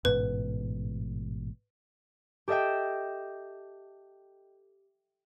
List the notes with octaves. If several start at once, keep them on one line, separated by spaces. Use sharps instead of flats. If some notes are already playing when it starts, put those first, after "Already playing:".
A1 G#2 B2 B4
G4 A4 D#5 E5 G5